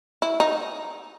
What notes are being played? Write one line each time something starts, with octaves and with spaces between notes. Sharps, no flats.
E4
D#4